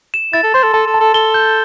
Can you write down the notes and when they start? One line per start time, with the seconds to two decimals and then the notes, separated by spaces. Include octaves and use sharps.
0.14 E7
0.33 E4 A6
0.43 A4
0.54 C5 C6
0.63 A4
0.73 A4 A5
0.87 A4
0.94 A5
1.00 A4
1.14 A4 G7
1.34 G6